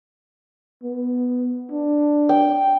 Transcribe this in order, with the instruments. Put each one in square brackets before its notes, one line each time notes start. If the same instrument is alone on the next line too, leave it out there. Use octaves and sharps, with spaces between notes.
[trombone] B3
D4
[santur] G5